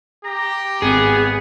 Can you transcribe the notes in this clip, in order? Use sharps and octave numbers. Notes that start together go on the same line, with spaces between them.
G4 A#5
G#1 B3 G#4